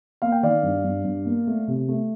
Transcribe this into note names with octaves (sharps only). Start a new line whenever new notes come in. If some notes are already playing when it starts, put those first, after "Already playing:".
A#3 F5
G5
D#3 D5 F5
G2
G2
G2
A#3
A3
C3
A3